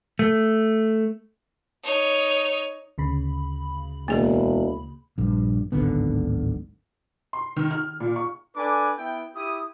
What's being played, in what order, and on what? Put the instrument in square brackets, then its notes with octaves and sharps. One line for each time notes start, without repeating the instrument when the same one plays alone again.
[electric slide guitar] A3
[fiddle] D#4 C#5
[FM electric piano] D2 C#3 B5
[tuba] E1 [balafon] A#3 G#4
[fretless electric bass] A#1 G2
D1 G#1 D3 B3
[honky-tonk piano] C6
D#3
F6
A#2
C#6
[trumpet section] D4 A4 B4 G#5 D6
B3 E4 G5
E4 G4 D#6